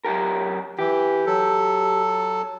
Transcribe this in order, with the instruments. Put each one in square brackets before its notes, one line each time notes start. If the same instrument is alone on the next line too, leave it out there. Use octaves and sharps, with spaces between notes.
[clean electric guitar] F#2 G4 A#4
[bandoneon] E3 [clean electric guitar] G4
[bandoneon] F#3 A4